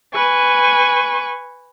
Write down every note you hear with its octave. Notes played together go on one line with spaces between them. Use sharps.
B4 G#5 C#6